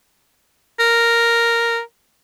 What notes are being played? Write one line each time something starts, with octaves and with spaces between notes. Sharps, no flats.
A#4